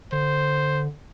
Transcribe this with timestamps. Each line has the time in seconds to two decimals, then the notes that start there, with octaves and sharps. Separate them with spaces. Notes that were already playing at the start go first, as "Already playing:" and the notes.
0.12 D3 C5